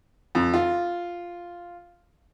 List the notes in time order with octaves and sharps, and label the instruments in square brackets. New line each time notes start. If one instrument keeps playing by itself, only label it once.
[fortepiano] F2
F4